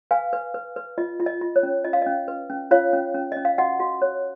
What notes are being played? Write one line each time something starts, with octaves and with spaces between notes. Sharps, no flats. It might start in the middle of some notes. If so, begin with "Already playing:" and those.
B4 F5 G#5
B4
B4
B4
F4 D#5
F4
D#5
F4
C#5
C#4
F4 D#5
F5
C#4 D#5
B4
C#4
F4 C#5 F5
C#4
C#4
C#4 D#5
F5
F#4 D#5 F#5
F#4
C#5